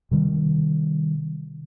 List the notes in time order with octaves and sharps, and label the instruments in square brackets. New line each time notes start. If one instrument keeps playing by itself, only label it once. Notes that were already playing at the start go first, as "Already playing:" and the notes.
[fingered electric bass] C3 D#3 G3